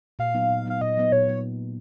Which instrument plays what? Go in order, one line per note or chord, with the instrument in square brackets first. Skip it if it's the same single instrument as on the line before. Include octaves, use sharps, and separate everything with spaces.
[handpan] A#2 [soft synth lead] F5
[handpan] F#3 B3 D#4
A#2
[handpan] F#3 B3 D#4 [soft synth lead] F5
[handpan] A#2 [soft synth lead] D#5
[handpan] F#3 B3 D#4
[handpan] A#2 [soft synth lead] C#5
[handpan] F#3 B3 D#4